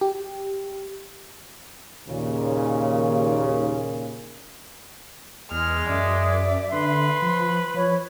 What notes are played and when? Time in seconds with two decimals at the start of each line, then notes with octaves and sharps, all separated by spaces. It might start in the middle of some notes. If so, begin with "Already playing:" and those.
0.01 G4
2.08 D#2 A#2 C#3
5.51 E2 G#3 F6
5.89 F#2 D5 E5
6.73 D3 B4 C6
7.22 F3
7.74 F3 C#5 B5